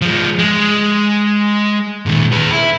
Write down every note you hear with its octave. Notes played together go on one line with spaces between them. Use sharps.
F3 G#3
G#3
A#2 D#3
G#4 B4
E4